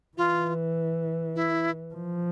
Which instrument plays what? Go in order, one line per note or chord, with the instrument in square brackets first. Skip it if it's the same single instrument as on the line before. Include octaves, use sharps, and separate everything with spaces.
[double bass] E3 [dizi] F4
[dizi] E4
[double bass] F3